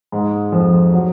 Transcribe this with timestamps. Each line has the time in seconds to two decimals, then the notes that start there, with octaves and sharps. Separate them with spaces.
0.12 G#2 G#3
0.52 F2 F3
0.94 F#3